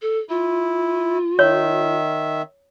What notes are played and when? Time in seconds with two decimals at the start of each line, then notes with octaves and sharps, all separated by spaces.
0.02 A4
0.29 E4 F4
1.39 D#3 C#5 E5